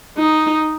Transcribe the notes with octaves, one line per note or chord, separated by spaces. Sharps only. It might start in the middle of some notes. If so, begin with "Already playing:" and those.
D#4